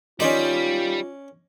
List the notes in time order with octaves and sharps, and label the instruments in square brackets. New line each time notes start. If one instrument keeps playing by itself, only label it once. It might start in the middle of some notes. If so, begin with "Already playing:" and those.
[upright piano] D#3 D#5 C6 [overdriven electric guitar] G3 [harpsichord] C#4 D5 [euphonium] F4